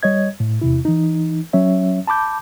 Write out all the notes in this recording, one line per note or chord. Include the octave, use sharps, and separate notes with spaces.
G3 C#5 D#5 G#6
A2
E2 C3 E4
E3 D#4
F#3 C#4 C#5 E5
A5 B5 D6 G6